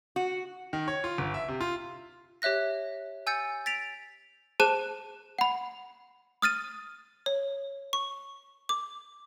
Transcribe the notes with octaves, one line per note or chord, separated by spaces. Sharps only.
F#4
D#3
C#5
F4
G1
E5
C3
F4
G4 C#5 E5 F#6 A#6
G#5 E6 G6 A6 C#7
A6 B6 D7 F7
G#4 C5 A5 F#6 D#7
F#5 B5
D#6 F6 A6 D#7
C#5
C#6
D6